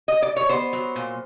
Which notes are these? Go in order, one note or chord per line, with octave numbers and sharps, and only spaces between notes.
D#5
D5
C#5
B3 C5
F#3
A#2